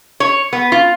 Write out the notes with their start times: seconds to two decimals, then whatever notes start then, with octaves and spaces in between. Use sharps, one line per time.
0.20 C#5
0.53 B3
0.72 F4